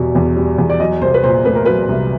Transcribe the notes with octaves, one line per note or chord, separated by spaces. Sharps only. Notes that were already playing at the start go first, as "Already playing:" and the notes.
Already playing: E2 B2 G3
E2
G3
E2
D5
F#3 D#5
C2 C5
B4
A#2 C5
A3 B4
A#4
F#3 B4
C2